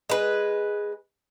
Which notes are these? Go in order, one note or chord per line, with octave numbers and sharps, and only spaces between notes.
G#3 B4